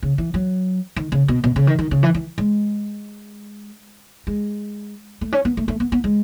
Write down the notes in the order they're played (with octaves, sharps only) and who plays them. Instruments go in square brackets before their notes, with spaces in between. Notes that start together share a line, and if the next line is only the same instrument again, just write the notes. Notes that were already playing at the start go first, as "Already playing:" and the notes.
[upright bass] C#3
E3
F#3
D#3
C#3
B2
B2
C#3
D#3
D#3
C#3
E3
E3
G#3
G#3
A3
C#4
B3
A3
A3
B3
B3
G#3